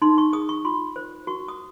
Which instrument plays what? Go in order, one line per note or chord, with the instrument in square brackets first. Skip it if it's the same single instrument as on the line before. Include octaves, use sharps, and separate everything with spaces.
[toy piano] D#4 C6
C#6
G#4 D#6
C#6
F4 C6
C5
F#4 C#6
D#6